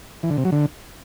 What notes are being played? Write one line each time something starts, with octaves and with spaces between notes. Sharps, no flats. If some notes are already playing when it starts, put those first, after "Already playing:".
E3
D3
C3
F#3
D3